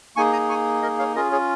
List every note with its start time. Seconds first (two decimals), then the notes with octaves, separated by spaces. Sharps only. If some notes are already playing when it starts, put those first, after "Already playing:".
0.16 A#3 D#4 G#4 G#5 C#6
0.33 A#5 D#6
0.49 G#5 C#6
0.82 A#4 D#5
0.99 C#5 F5
1.15 C#4 F4 G#4 A#4 D#5
1.32 G#4 C#5